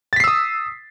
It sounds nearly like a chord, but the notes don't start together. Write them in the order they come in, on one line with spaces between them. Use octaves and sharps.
A6 B6 C7 E6 D#6